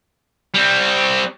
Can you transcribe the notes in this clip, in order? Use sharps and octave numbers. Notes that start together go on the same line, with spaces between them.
G3 C4